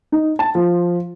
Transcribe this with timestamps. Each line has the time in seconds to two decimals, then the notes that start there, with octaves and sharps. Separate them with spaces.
0.12 D#4
0.39 A5
0.55 F3